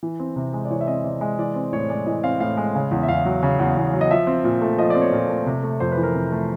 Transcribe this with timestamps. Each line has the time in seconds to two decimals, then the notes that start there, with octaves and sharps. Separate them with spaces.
0.03 E3
0.20 C4
0.36 C3
0.53 G#3
0.65 D5
0.71 E3 C#5
0.81 E5
0.87 C4 D#5
1.04 C3 D5
1.21 G#3 D#5
1.38 E3 D5
1.55 C4
1.73 A2 C#5
1.89 G#3 D5
2.06 E3 D#5
2.24 C4 F5
2.40 A2 F5
2.57 G#3
2.75 C#3
2.91 E2
3.03 E5
3.08 E2 F5
3.25 F#3
3.43 C#3
3.59 E2
3.77 E2
3.94 F#3
4.01 D#5
4.10 F3 E5
4.27 C4
4.44 A#2
4.61 A3
4.78 F3 D#5
4.90 D5
4.95 C4
5.01 C#5
5.12 A#2
5.29 A3
5.46 C3
5.63 A3
5.80 F2 C5
5.92 B4
5.97 E3
6.03 A#4
6.15 C3
6.32 A3